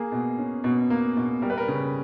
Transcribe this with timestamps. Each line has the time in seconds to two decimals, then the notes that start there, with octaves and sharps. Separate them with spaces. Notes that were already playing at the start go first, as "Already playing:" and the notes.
Already playing: A#3 G#4
0.12 B2
0.38 C#4
0.64 B2
0.90 A#3
1.17 B2
1.42 G3 A#4
1.50 B4
1.58 A#4
1.68 C#3